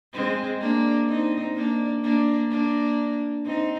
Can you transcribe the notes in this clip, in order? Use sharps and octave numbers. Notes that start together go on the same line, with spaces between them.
G#3 C4
A#3 D4
C4 D#4
A#3 D4
A#3 D4
A#3 D4
C4 D#4